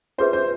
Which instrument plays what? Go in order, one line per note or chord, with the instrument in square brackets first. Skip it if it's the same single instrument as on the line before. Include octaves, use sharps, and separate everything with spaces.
[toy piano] C#4 F4 G#4 B4 E5 [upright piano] C5
[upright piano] C5